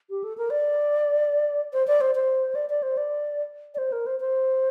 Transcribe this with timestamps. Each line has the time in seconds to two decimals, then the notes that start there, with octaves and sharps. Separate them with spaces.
0.10 G4
0.24 A4
0.38 A#4
0.50 D5
1.73 C5
1.87 D5
2.01 C5
2.15 C5
2.55 D5
2.70 D5
2.82 C5
2.97 D5
3.74 D5
3.78 C5
3.92 A#4
4.06 C5
4.20 C5